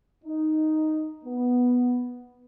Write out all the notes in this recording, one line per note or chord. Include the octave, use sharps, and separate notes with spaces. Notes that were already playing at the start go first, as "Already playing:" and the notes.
D#4
B3